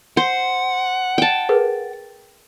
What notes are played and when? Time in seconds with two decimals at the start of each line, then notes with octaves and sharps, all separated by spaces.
0.17 C5 F#5
1.18 G5 A5
1.49 G#4 A#4 B4